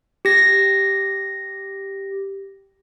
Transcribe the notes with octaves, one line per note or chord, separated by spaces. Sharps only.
G4 A#6